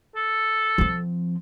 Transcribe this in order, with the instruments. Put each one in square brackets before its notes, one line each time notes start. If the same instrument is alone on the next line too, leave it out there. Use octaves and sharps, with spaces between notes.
[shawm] A4
[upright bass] F3 C4